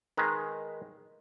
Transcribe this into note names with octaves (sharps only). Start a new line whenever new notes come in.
D#3 G#3 B4 A#5